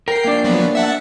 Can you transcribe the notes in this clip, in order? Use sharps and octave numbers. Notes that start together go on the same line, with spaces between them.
A#4 G5 C7
A#3 D4
F3 F#3 B3
E5 F#5 A5